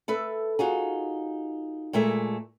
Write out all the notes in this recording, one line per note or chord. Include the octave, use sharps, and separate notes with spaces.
A4 B4 E5
D#4 F4 F#4 G#4
A#2 G#3 A3 E5